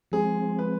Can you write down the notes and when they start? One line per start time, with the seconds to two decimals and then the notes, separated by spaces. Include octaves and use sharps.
0.12 F3 G#3 C4 G#4
0.59 B4